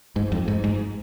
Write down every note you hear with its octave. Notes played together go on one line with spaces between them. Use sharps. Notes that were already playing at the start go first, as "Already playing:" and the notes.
G#2
F2
G#2
G#2